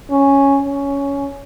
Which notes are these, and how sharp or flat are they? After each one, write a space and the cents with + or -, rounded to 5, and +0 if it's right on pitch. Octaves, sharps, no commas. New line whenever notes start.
C#4 -5
C#4 +10